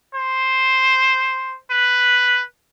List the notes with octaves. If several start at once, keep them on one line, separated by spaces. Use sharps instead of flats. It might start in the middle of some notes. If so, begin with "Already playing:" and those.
C5
B4